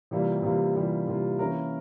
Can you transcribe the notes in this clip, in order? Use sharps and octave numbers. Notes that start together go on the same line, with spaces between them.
C3 E3 G3 A#3 F4
C3 E3 G3 A#3 F4
C3 E3 G3 A#3 F4
C3 E3 G3 A#3 F4
E3 A#3 C#4 E4 A#4